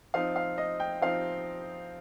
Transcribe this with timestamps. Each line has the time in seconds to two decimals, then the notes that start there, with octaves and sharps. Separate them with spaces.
0.14 F3 C4 D#4 F5
0.36 F5
0.58 D#5
0.80 G5
1.02 F3 C4 D#4 F5